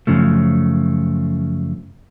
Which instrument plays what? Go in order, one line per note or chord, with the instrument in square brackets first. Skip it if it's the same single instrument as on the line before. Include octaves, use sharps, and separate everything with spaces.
[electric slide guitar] F#2 C#3 F3 A3